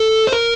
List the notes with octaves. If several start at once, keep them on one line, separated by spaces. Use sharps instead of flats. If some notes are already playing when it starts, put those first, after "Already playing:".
Already playing: A4
C5
A#4